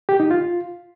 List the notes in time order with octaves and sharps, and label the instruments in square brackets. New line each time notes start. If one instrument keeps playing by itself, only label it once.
[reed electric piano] G4
D#4
F4